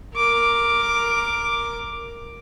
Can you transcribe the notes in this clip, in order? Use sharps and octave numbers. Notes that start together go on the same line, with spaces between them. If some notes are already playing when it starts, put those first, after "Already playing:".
A#4 D6